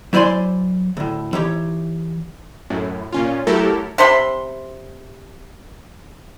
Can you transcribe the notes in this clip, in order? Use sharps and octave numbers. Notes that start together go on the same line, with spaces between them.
F#3 E4 C5 D5 G#5 C6
D2 A2
E3 D#4 G4 C#5
F#2 A2
A#2 C#4 F4
F#3 A3 E4 G4 A4 A#4
C3 C5 B5 C6